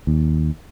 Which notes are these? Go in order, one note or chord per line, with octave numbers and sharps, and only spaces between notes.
D#2